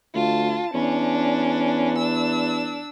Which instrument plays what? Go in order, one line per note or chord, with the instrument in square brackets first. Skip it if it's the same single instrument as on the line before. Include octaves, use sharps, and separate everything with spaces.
[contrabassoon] D2 [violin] F4 A5
[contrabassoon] E2 [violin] C#4 D4
[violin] D4 E6